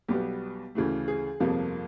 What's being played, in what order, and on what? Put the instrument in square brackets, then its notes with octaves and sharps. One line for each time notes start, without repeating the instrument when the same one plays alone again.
[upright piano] B1 B2 G3 B3 G4
D2 C#3 E3 A3
G#4
G1 F2 C3 F3 A#3